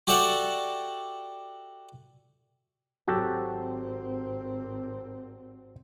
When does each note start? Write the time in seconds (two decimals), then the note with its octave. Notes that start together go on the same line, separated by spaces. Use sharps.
0.07 F#4 G4 A4 D5 E5 F#5
3.08 G#1 F#3 C4 F#4 G4 A4